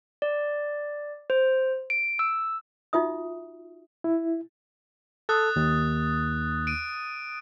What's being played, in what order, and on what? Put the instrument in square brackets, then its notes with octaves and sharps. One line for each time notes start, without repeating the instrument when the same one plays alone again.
[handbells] D5
C5
D7
E6
[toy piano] D#4 F4 F#4 E5 D#6
[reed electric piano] E4
[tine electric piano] A4 [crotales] D#6 F#6 A6
[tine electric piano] D#2
[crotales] D7 D#7